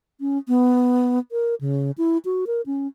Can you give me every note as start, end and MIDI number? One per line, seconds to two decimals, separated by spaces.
0.21 0.38 61
0.48 1.19 59
1.32 1.55 70
1.61 1.91 49
1.98 2.18 64
2.25 2.45 66
2.47 2.61 70
2.66 2.87 61